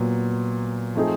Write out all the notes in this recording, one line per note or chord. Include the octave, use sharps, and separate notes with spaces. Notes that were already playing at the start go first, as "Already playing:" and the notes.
Already playing: A#2 F#3 B3
F3 A3 C4 D#4 G#4